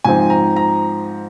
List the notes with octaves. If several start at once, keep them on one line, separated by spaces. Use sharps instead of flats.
G#2 F3 C4 G#5
A#5
A#5